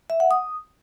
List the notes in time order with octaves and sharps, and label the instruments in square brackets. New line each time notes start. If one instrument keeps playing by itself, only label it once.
[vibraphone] E5
F#5
D#6